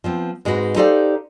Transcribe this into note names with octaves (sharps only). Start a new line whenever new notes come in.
F3 B3 C4
G#2 G#3 C4 F#4 B4
D#4 G4 A4 C5 D5 F5